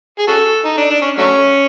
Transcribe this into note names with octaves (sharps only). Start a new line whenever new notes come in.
G#4
C#4 F#4 A4
D#4
D4
D4
C#4
F#3 A3 C#4